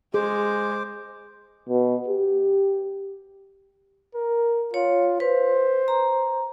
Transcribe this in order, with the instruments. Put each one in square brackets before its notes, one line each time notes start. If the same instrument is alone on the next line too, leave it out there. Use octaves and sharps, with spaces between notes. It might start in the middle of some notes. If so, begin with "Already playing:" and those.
[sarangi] G#3 [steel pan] G#4 [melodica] C5 D6
[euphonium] B2
G4
[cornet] A#4
[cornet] F4 [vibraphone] C#5
[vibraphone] B4 [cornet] C5
[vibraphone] A#5